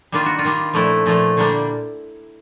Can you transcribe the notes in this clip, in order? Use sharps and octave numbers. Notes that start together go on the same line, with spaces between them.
D#3 G3 A#3 D4 F4
F#4
F4
D#3 G3 A#3 D4
A#2 F3 A3 E4
A#2 F3 A3
D3 G3 A#3 D4